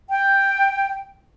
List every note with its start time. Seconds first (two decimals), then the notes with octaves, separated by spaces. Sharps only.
0.10 G5